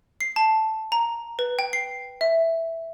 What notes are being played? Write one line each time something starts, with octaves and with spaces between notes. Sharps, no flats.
C7
A5
A#5
B4
G5
C7
E5